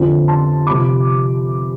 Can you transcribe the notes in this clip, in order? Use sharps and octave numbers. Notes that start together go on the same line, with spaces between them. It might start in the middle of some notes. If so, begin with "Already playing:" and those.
Already playing: F2 D3 F3 C4
A5 C6
C3 F3 B5 D6